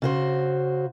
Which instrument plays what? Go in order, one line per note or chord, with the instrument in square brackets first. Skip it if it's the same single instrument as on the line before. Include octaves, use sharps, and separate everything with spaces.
[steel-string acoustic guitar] C#3 F#4 C5